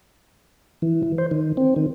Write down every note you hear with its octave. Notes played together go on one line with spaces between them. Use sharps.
E3
E3
C5
D#3
C4
D#3